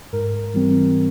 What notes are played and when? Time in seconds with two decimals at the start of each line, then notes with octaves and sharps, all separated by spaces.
0.13 G#2 A#4
0.54 E3 G3 C4